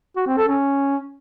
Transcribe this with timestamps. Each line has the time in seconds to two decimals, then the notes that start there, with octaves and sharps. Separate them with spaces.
0.16 F#4
0.27 C4
0.37 A4
0.48 C#4